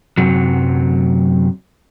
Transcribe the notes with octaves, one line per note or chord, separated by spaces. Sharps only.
F#2 C3 F#3